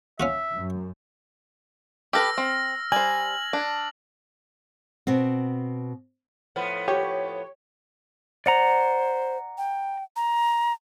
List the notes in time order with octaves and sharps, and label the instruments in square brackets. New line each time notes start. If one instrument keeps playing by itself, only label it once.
[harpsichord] C#4 F4 F#4 [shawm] E5
[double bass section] F#2
[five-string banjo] G4 A4 B4 [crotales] E6 F6 A#6
[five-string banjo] C4
[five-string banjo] G3 C5 [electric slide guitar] G#5 [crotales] F#7
[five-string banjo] D4
[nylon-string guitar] B2 B3 C4
[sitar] A2 F3 B3
[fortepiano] G4 [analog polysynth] C#5
[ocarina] C5 [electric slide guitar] D5 F#5 A#5
[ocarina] G5
A#5